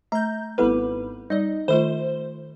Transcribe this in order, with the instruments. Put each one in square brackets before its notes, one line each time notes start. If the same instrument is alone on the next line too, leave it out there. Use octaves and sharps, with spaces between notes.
[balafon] A3 [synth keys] A#5 G6
[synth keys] G#1 G3 B4 [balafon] B3 E4 A4
[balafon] G3 D5 [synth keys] D#4 D#5
[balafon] D#3 A3 F4 [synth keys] C5